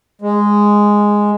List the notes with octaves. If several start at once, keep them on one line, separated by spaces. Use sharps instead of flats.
G#3